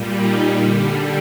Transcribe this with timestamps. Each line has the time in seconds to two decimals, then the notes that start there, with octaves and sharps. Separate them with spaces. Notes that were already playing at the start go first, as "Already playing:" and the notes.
Already playing: A#2 G3
0.17 D#4
0.57 D3 G3